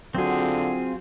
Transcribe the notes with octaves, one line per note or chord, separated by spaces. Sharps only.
D3 F#3 C4 F4 F#4 G#4